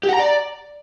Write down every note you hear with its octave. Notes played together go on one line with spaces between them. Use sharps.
G4
F#5
A#5
D5